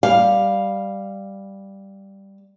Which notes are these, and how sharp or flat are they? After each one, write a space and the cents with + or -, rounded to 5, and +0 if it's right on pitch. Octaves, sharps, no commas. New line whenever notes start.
G3 +0 F5 +0